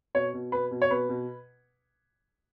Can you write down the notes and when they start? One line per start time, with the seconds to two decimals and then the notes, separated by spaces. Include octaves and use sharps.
0.15 B2 C#5
0.34 B2
0.52 B2 B4
0.71 B2
0.82 C#5
0.91 B2 B4
1.09 B2